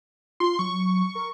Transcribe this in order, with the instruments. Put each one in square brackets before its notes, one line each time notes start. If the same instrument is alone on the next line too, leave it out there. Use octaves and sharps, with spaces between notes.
[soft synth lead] F4 [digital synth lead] C6
[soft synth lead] F#3 [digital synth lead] C#6
[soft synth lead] A#4